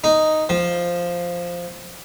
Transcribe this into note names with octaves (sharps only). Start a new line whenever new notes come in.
D#4
F3